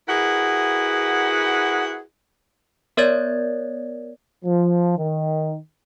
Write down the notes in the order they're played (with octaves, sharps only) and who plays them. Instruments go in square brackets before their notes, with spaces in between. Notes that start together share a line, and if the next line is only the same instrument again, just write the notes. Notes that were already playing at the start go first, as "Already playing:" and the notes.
[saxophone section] E4 F#4 G#4 A#4 B4 F#5
[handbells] B3 A#4 C#5 D5 G#6 A6
[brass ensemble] F3
D#3